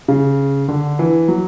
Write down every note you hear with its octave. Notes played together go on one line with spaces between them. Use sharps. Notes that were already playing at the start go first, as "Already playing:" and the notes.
C#3
D3
E3
F#3